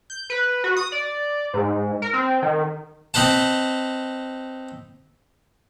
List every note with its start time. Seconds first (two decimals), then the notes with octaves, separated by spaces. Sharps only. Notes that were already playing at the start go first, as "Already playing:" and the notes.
0.10 G6
0.30 B4
0.64 F#4
0.77 D#6
0.92 D5
1.54 G#2
2.02 A#4
2.13 C4
2.42 D#3
3.14 C4 D#4 B4 C5 A5